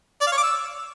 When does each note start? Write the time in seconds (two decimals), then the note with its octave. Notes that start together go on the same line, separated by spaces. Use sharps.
0.21 D5
0.26 F5
0.32 C#5
0.37 D6
0.43 E6